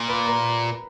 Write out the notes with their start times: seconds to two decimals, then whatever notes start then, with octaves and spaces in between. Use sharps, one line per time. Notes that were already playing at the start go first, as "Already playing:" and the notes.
Already playing: A#2
0.08 B4 B5
0.26 A#4 A#5